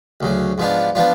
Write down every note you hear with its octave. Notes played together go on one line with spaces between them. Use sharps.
D2 C#3 F#3
G#2 F3 B3 D4 F4
F3 B3 D4 F4